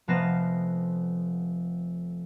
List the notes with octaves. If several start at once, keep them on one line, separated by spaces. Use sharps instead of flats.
F1 F3 B3 F5 A#6 E7